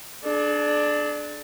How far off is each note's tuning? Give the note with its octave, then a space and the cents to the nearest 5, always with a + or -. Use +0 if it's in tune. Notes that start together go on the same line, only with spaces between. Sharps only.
D4 +10 G#4 +45